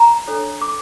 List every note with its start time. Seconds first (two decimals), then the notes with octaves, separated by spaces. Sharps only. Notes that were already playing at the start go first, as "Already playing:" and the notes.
Already playing: A#5
0.28 D4 A4 C#5
0.62 D6